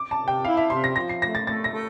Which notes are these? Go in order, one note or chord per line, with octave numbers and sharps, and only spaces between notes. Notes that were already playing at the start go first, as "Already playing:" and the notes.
Already playing: D6
A5
C3
G5
E4 F5
E5
C3 C6
A#6
F3 A#6
C7
A3 A#6
A6
A3 A6
A#6
A3